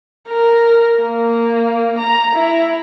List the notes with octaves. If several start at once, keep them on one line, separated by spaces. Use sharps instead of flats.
A#4
A#3
A#5
E4